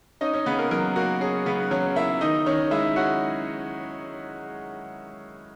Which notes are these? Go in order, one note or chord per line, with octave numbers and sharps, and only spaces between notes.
C#4 D#4 D#5
C#4 C#5
C#3 B3 B4
A#3 A#4
F#3 A#3 A#4
A#3 F#4
C#4 G#4
C#3 B3 B4
F#3 C#4 C#5
A#3 E4 E5
D#3 D#4 D#5
D#3 C#4 C#5
G#3 E4 E5
C#4 F#4 F#5